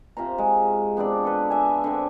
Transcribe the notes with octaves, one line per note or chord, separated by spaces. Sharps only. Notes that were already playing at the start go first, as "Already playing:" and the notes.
C3 F4 C5 A#5
G#3
B3 C4 D4 D5
A4 B4
E5 G#5
D3 C4